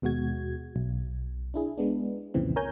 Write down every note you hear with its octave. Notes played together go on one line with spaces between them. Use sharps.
D#2 B2 G#3 F#4 G#6
B1
D4 E4 G#4
G#3 B3 D4
C2 F2 A#2 C#3 E3 C4
A#4 C#5 G#5 A#5 G6